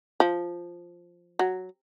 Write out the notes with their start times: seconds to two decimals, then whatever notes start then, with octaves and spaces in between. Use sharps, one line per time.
0.20 F3
1.39 F#3